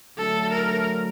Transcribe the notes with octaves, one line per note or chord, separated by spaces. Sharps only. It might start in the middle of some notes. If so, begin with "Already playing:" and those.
D3 F#3 A3 A4
A#4